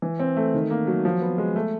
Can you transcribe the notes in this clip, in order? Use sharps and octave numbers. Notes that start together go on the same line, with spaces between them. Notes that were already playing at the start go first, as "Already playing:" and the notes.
E3
C4
A3
D#3
A#3
F#3
F3
B3
G#3
A3